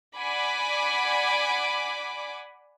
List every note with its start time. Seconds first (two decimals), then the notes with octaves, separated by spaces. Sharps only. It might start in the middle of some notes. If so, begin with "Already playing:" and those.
0.17 D5 F#5 G#5 B5 D6